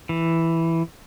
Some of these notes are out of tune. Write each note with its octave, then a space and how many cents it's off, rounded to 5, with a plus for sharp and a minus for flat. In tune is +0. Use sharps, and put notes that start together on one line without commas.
E3 +0